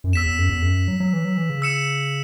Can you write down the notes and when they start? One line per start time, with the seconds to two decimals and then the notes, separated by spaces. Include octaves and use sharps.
0.04 F#2
0.13 E2 E6 B6 E7
0.26 E2
0.38 F#2
0.49 E2
0.62 F#2
0.88 F#3
1.00 F#3
1.13 E3
1.25 F#3
1.37 E3
1.50 C#3
1.62 E6 C#7 E7